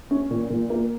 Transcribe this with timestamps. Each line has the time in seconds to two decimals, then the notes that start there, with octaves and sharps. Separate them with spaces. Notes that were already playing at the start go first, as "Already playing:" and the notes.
0.11 C#4
0.31 A#2
0.50 A#2
0.70 A#3